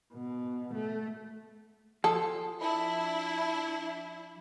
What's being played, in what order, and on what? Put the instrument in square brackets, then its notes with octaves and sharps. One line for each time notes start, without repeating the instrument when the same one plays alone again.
[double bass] B2
A3
[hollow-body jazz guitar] F3 [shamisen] A4 [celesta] G#5 D#6
[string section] D4 E4 [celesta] A5 B5